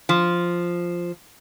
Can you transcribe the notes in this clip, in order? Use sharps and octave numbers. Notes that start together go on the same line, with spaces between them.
F3